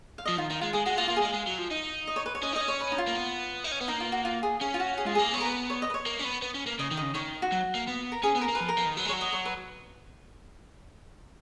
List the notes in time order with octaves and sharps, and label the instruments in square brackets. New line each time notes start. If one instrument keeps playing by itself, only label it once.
[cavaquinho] F5
[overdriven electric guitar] F3 [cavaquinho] D#5
[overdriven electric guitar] D#3 [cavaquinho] F4
[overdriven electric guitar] D#3 [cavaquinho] D#4
[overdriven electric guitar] G#3 [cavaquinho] F4
[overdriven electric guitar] G#3 [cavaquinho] G#4
[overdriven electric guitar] G#3 [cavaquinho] F#4
[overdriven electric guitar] A#3 [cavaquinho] F4
[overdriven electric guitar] A#3 [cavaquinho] F4
[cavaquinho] G#4
[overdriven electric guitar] G#3 [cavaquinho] F5
[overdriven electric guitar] G#3
F#3
F3
D#4
[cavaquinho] D#5
C#5
B4
C#5
[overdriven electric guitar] C#4 [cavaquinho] D#5
[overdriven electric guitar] D#4
[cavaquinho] D#5
[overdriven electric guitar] C#4
[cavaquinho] C#5
B4
D#4
F4
[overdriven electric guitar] A#3
B3
D#4
C#4
B3
[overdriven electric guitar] A#3 [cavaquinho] D#4
[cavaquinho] F4
F#4
F4
G#4
[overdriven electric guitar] C#4 [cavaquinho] G#4
[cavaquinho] F4
F#4
G#4
[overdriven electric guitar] G#3 [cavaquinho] F4
[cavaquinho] G#4
[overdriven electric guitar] A#3
[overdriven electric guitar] B3 [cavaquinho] C#5
[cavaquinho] A#4
B4
C#5
D#5
B4
C#5
[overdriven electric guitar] A#3
C#4
B3
B3
C#4
A#3
[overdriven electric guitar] C#3 [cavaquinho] D#5
[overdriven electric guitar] D#3
[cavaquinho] D#5
[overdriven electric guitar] C#3
[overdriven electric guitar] D#3 [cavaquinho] C#5
[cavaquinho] F#4
[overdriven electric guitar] F#3
A#3
B3
[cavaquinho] A#4
[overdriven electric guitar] C#4 [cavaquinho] G#4
[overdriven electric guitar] B3
[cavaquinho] A#4
[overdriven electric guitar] A#3
[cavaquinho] B4
[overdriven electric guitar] F3
[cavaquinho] A#4
[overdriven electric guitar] F3
D#3
[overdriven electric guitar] F#3 [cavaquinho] B4
[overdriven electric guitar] G#3
[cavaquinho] C#5
[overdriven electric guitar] F#3
[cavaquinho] D#5
C#5
B4